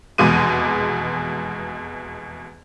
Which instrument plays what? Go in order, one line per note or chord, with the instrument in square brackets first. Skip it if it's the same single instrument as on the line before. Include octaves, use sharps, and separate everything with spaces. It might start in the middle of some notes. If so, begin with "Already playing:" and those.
[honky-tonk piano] F1 E2 B2 G#3 D6 D#7